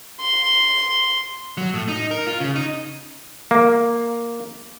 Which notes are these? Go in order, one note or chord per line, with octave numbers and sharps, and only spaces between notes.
C6
F#3
A2
D#4
A#4
F4
C#3
D#4
A#3